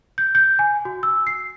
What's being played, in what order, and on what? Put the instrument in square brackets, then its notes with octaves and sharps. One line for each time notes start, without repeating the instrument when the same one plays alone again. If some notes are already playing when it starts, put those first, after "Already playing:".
[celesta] G6
G6
G#5
F#4
E6
C7